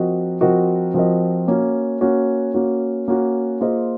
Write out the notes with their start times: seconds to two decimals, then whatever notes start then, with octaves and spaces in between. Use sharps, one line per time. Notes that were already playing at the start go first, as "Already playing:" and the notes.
Already playing: F3 C4 F#4 A#4 D#5
0.41 F3 C4 F#4 A#4 D#5
0.94 F3 C4 F#4 A#4 D#5
1.48 A#3 C#4 F#4
2.01 A#3 C#4 F#4
2.54 A#3 C#4 F#4
3.08 A#3 C#4 F#4
3.61 A#3 F4 G#4 C5 D#5